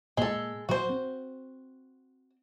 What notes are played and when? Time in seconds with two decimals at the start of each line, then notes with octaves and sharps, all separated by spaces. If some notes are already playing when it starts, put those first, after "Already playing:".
0.17 A#2 G#3 A#3 A4
0.69 A#2 F#3 F#4 C5
0.89 C4